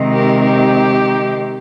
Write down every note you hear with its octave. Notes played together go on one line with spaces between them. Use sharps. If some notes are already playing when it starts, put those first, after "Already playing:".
Already playing: C3 D#3 G#3 C4 D#4
G4 A#4
G4